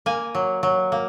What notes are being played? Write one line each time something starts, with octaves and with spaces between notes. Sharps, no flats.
A#3 G#5
F#3
F#3
A#3